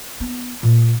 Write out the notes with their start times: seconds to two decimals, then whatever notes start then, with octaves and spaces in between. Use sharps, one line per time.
0.20 B3 D4
0.63 A#2